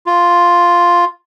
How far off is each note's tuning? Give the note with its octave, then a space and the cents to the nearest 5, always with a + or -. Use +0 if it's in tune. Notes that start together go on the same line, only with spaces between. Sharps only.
F4 +0